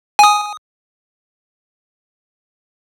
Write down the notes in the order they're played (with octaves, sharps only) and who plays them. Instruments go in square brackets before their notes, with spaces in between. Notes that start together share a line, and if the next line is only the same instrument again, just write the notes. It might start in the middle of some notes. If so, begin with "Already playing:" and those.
[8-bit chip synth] G#5 D#6